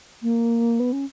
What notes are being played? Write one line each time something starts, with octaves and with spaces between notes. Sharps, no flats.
A#3
B3
C#4